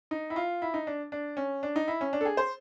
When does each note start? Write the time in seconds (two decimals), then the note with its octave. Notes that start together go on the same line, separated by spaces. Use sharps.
0.11 D#4
0.30 E4
0.36 F4
0.62 E4
0.74 D#4
0.87 D4
1.12 D4
1.37 C#4
1.63 D4
1.76 D#4
1.88 E4
2.01 C#4
2.13 D4
2.21 A4
2.25 G#4
2.37 C5